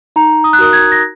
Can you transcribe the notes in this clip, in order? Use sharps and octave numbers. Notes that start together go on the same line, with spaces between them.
D#4 A#5
D#6
F#6
F#4 A#4 D#6
G#6
A#6